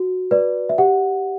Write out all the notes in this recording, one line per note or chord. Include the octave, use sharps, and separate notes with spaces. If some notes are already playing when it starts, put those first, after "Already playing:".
Already playing: F#4
B4 D5
E5
G4 F#5